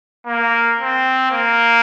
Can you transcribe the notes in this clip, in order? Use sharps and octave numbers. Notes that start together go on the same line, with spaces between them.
A#3
C4
A#3